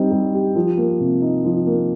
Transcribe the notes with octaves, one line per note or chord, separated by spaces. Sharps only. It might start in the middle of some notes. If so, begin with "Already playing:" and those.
Already playing: G3 C4 D#4 G4
G3
G4
F3
A#3
C3
D#4
F3
A#3